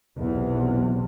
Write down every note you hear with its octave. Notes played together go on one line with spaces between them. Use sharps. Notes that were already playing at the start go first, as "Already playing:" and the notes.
B1 E2 C3